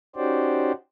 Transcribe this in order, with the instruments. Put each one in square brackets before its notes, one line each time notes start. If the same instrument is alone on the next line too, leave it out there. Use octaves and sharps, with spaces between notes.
[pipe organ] C#4 D#4 F#4 G4 C5 D5